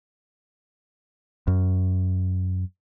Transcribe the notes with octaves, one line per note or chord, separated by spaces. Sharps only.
F#2